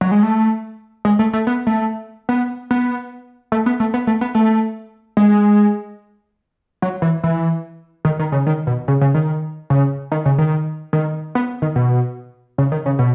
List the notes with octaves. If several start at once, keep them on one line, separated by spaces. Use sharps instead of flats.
F#3
G#3
A3
G#3
A3
A3
B3
A3
B3
B3
A3
B3
A3
B3
A3
B3
A3
G#3
F#3
E3
E3
D#3
D#3
C#3
D#3
B2
C#3
C#3
D#3
C#3
D#3
C#3
D#3
D#3
B3
D#3
B2
C#3
D#3
C#3
B2